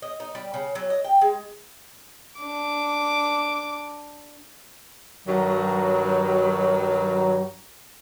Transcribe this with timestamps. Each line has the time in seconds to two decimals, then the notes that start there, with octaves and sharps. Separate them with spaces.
0.02 D#5
0.20 D#4
0.35 G3
0.54 C#3
0.75 F#3
0.90 D#5
1.04 G5
1.21 G#3
2.39 D4 D6
5.26 G2 D#3 F#3